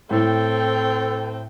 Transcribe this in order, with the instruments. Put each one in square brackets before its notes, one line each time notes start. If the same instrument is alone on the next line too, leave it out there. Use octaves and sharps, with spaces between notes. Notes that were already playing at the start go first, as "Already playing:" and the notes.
[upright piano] A2 [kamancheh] C4 G5 [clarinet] A4